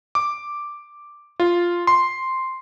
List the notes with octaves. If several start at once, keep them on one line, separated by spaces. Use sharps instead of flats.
D6
F4
C6